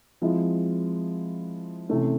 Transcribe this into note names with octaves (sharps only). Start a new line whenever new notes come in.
F3 G#3 C4 E4
C3 E3 A3 C#4